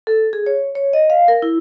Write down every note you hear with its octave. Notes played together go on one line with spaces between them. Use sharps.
A4
G#4
C#5
C#5
D#5
F5
A#4
E4